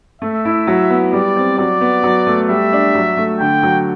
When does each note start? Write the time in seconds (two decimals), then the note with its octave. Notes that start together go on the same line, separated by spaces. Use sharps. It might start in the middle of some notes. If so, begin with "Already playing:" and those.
0.22 A3 E5
0.45 E4
0.67 F#3
0.90 B3
1.13 G3 D5
1.36 C4
1.58 F#3 D5
1.81 B3
2.03 F#3
2.27 A3
2.49 G3 E5
2.73 D4
2.95 F#3
3.17 A3
3.40 D3 G5
3.63 F#3